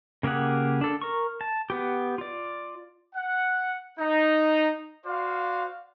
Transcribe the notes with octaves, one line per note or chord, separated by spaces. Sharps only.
C#3 A#3 G4 G#4 F#5
D4 A4
A#4 C#6
A5
B3 G4
F4 D5
F#5
D#4
F#4 C5 D5 F5